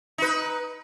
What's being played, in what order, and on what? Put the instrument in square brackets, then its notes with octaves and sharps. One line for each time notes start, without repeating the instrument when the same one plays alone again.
[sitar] D#4 B4